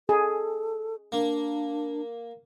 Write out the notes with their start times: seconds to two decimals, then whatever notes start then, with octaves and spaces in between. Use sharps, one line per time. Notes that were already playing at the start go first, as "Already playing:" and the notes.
0.09 G#4 A4
1.12 A#3 D4